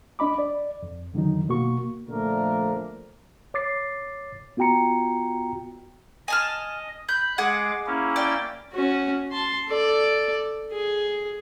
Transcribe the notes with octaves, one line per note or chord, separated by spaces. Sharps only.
D4 D#5 B5 D6
D5
F2
F2 D3 D#3 F#3 D#4
B2 A#3 F#4 C#6
A#2 D3 F3 A3 D4 A#4
C#5 D6 A6 C7
B3 F4 F#4 G5 A#5 C#7
D#5 G#5 A5 F6
B5 F#6 G6
G#3 G#4 F#5 D6
A#3 C#4 E4
D5 G5
C#4 F#4
A5 C6
A4 D5
G#4